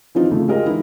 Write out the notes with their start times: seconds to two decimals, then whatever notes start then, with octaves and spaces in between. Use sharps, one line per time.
0.15 E3 F3 C4 D#4 F4
0.31 F2 C#3 A3
0.48 G#3 F4 G4 A#4 D#5
0.66 E3 D#4 E4